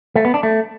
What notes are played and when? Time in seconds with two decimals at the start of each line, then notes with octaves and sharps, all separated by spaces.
0.16 A3
0.25 B3
0.34 D4
0.43 A3